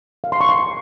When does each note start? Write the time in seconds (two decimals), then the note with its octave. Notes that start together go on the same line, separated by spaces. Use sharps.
0.24 F5
0.32 C6
0.41 C#6
0.49 C6